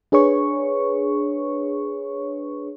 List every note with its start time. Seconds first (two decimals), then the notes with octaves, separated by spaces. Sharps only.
0.12 D4 G#4 B4 C#5 C#6